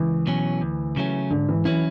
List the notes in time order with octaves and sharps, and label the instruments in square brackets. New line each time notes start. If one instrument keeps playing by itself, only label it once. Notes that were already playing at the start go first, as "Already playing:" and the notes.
Already playing: [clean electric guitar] C#2 [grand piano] E3
[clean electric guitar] B2 F#3 C#4
D2
C#3 F#3 A3 C#4
[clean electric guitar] G#2 [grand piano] D3
[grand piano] E3
[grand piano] E3 [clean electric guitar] F#3 C#4 E4